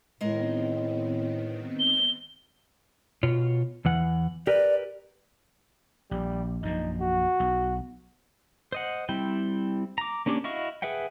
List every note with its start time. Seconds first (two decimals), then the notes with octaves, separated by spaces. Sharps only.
0.21 A2 D#3 G#3 B3 C4 A#4 D#5
1.80 G7
3.23 B2 F4 C#5
3.85 E2 E3 F#5
4.47 G4 A#4 B4 D5
6.11 A#1 G3
6.63 A#1 F#2 A#2 D#4
7.01 F#4
7.40 B1
8.72 C5 D#5 F#5
9.09 G3 C4 E4 G5
9.98 A#5 D6
10.26 A#3 C#4 D4 G4 C#5
10.44 E4 F#4 D#5 F5 C#6
10.82 G#4 B4 E5 F#5 G5